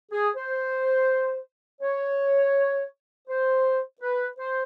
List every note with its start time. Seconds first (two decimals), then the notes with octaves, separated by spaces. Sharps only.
0.12 G#4
0.36 C5
1.82 C#5
3.29 C5
4.01 B4
4.38 C5